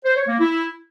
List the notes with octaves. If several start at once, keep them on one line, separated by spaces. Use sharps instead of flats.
C5
C#5
A#3
E4